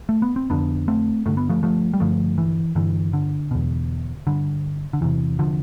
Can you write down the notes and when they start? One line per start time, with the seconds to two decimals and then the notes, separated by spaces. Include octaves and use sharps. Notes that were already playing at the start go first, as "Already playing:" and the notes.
0.09 A3
0.22 B3
0.36 C4
0.50 F2 D3 B3 D4
0.88 A3 C4
1.25 G2 D3 A3
1.37 B3
1.49 F3 A3
1.63 F3 A3
1.93 G3
2.00 G2 D3 F3 A3
2.38 E3
2.75 G2 D3 E3
3.13 D3
3.51 E2 B2
4.27 G2 D3
4.93 D3
5.01 E2 C3 E3
5.39 D3 F3